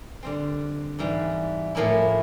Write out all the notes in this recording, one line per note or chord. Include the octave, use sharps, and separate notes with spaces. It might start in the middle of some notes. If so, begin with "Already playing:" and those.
D3 G3 C4
G#2 E3 G3
A2 F3 A#3 C#4 E4